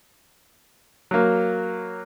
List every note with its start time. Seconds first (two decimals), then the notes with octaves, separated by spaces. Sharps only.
1.11 F#3 A#3